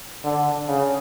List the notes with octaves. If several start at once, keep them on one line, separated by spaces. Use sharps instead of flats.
D3
C#3